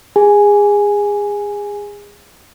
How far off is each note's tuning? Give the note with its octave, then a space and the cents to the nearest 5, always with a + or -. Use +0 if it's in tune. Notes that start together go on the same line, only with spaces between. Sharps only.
G#4 -25 G#5 +0